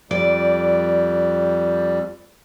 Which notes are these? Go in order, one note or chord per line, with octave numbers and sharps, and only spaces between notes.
F2 G3 D5